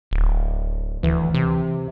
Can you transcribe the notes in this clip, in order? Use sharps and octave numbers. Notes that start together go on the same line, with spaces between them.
D1
D2 E3
C3